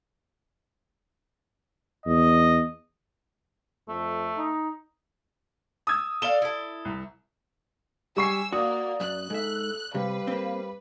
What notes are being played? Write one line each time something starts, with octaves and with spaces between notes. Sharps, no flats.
E2 D#5
F2 A3
D#4
D#6 E6 G#6
A4 D5 F5 E7 G7
E4 A4
C2
G3 G#5 C#6 E6 C7
A#3 F#4 D5 D#6
F#2 F#6
G#2 A4 E5
C3 G3 B4 F5
A#3 C4